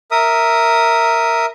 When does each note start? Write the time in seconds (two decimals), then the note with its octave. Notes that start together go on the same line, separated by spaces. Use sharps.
0.11 A#4 E5 D#6